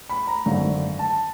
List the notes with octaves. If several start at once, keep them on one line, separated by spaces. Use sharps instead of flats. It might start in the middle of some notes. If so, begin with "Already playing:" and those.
B5
A#5
G#1 F#2 D3
A5